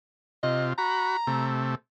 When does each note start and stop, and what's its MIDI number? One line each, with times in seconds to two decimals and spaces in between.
0.43 0.73 48
0.43 0.73 65
0.43 0.67 75
0.78 1.17 66
0.78 1.61 82
0.78 1.17 83
1.27 1.75 48
1.27 1.75 57